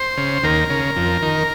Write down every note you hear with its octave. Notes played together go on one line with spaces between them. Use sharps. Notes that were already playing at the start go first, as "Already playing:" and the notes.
Already playing: C5
C#3
D#2 A#4
C#3
F2
D#3